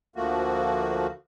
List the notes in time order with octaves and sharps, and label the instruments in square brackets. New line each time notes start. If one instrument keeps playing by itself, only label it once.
[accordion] D2 F3 A3 A#3 F#4